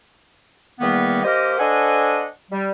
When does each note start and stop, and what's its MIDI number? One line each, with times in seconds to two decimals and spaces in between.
0.80 1.23 40
0.80 1.23 51
0.80 1.23 55
0.80 1.23 58
0.80 1.23 59
1.24 1.58 58
1.24 1.58 67
1.24 1.58 70
1.24 1.58 72
1.24 1.58 75
1.59 2.25 62
1.59 2.25 69
1.59 2.25 72
1.59 2.25 75
1.59 2.25 78
1.59 2.25 80
2.50 2.71 55